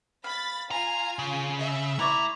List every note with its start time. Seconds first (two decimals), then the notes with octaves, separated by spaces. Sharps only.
0.24 F5 B5 A6
0.71 F4 G#5 A#5
1.19 C#3
1.61 E5
1.99 A3 E4 D5 A#5 C#6